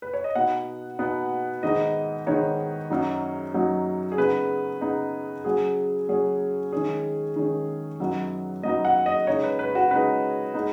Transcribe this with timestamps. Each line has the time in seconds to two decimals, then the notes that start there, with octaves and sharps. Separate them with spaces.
0.02 B4
0.14 C#5
0.24 D#5
0.35 B2 B3 D#4 F#5
0.99 B2 B3 D#4
1.63 G#2 D#3 B3 D#4 D#5
2.26 G#2 D#3 B3 D#4 C#5
2.90 F#2 F#3 D#4
3.54 F#2 F#3 D#4
4.12 G#4
4.17 C#3 B3 D#4 B4
4.81 C#3 B3 D#4
5.45 C#3 F#3 C#4 G#4
6.09 C#3 F#3 C#4 G#4
6.72 D#3 G#3 C#4 G#4
7.36 D#3 G#3 C#4
8.00 F#2 F#3 B3 D#4
8.63 F#2 F#3 B3 D#4 D#5
8.85 F#5
9.06 D#5
9.27 C#3 G#3 D#4 C#5
9.44 B4
9.59 B4
9.75 F#4
9.91 C#3 G#3 D#4 B4
10.54 G#3 B3 D#4